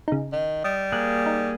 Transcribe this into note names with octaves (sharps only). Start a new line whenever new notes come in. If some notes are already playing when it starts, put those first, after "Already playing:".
C#3 D#4
D#3
G3 D#5
A#3 G#4 F#6
D#4